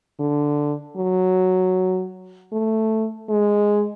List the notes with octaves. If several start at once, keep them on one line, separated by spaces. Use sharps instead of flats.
D3
F#3
A3
G#3